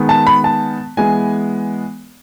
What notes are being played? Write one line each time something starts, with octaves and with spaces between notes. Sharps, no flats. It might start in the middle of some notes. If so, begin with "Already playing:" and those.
Already playing: D#3 G#3 B3
A5
B5
A5
E3 G#3 B3 G#5